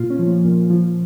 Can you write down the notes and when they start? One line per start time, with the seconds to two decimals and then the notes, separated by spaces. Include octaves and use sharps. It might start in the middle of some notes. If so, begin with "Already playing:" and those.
Already playing: A#2 F4
0.10 C#4
0.19 F3
0.27 A#3
0.45 A#2
0.70 F3